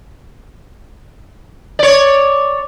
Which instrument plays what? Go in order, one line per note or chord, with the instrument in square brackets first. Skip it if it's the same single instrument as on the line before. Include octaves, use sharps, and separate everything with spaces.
[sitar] C#5 D5